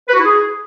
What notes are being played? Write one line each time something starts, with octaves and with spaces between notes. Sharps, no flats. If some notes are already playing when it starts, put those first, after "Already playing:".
B4
F#4
E4
G#4